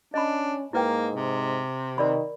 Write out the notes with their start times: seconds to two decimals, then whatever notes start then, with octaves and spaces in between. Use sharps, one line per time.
0.14 C#4 D4 D#5 B5
0.73 G#2 A#3 E4 B4 G5
1.15 C3
1.98 D#3 A#4 D5 B5